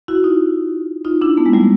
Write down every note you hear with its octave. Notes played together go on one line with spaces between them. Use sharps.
E4 F#4
D#4 F4
D#4 F4
D4 E4
A3 B3
G#3 A#3
G3 A3